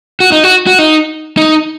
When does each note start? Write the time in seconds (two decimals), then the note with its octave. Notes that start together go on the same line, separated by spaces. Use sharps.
0.20 F#4
0.32 D#4
0.44 F#4
0.67 F#4
0.79 D#4
1.37 D#4